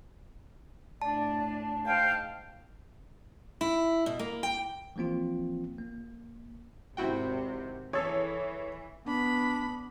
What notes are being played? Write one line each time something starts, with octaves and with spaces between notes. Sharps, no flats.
A2 D4 D5 A5
G#2 F5 G5 A5
E4
B2
A#3
G5
E3 F3 A#3 C4 F4
A#3
G#1 C3 E4 F#4 G5
E3 G#4 A4 C#5
B3 D4 B5